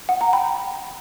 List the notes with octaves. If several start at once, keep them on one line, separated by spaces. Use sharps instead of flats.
F#5
F#5 A#5
G5 B5